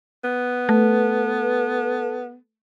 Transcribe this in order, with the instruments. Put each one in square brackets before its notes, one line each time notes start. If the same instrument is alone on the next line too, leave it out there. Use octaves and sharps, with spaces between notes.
[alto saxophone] B3
[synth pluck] A3 [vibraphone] A4 B4 A5